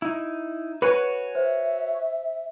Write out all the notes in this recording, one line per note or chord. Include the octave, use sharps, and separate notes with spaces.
D#4 E4
F#4 B4 C#5 G#5
C5 E5